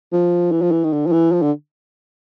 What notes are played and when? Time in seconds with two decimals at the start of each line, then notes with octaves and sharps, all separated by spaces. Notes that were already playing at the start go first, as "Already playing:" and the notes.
0.13 F3
0.51 E3
0.61 F3
0.71 E3
0.84 D#3
0.93 D3
1.06 F3
1.12 E3
1.32 F3
1.42 D3